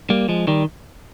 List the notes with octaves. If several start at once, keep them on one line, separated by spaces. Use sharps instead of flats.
G3 A#3
F3 G#3
D#3 G3